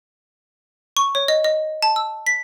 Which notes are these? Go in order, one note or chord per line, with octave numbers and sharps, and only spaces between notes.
C#6
C#5
D#5
D#5
A5
E6
B6